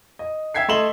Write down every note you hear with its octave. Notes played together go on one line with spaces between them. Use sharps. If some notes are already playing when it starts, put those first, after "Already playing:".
D#5
E5 G5 G#6 B6 C7
A3 D#5 C6 E7 F#7 G7